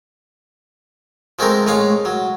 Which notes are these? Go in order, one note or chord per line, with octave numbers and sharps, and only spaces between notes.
F3 G#3 A3 C4 A#4
A2 G#3 C#5 F5
F#3